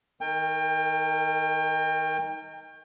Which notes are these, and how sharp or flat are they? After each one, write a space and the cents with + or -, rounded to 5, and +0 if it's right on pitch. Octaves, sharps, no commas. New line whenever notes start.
D#3 +15 A#4 -35 G5 +30